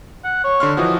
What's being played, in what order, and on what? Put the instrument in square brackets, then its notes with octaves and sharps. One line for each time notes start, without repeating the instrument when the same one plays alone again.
[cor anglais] F#5
C#5
[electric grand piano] D3 C6 F6
[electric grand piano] E3 F3 F#4 [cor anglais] D#5